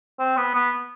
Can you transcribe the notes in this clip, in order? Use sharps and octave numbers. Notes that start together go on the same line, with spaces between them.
C4
B3
B3